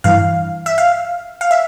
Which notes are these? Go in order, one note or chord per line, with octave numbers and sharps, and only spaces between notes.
G2 E3 F5
E5
F5
F5
E5